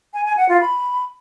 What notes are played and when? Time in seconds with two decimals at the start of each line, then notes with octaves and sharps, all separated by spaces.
0.14 G#5
0.26 G#5
0.37 F#5
0.49 F4
0.61 B5